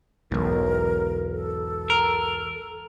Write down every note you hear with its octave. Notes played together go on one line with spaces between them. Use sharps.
B1 E2 G#2 A#4
A4
A#4